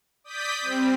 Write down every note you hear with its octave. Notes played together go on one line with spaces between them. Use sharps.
D5 D#6 G6 B6
G3 C4